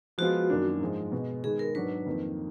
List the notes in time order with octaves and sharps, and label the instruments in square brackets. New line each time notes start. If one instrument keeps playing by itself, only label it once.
[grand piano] F3 G#3 B3 F4 [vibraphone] F#4
[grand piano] F#2 D#3 A#3 D4
G#2 F3 G#3
B2 G#3 B3
[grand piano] D#3 G#3 B3 [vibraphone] G#4
[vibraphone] A#4
[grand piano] G#2 F#3 D4 F#4 [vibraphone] B4
[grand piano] F2 D#3 A#3